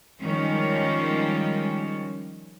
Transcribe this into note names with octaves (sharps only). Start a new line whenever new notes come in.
D#3 F3 G3 G#3 C#4